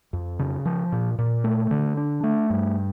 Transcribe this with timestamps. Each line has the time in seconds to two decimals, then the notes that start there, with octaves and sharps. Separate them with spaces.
0.13 F2
0.39 C#3
0.65 F3
0.92 A#2
1.19 A#2
1.44 A3
1.71 D3
1.97 D4
2.23 A3
2.50 G2